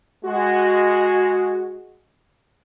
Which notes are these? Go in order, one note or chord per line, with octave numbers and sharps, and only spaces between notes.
G#3 F#4